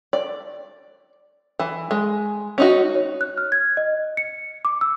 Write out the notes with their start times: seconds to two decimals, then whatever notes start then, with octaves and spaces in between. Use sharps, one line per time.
0.13 D5
1.59 E3
1.91 G#3
2.58 C#4 D#4 F#4
2.95 C#5
3.21 F#6
3.38 F6
3.52 G#6
3.77 D#5
4.17 C#7
4.65 D6
4.81 E6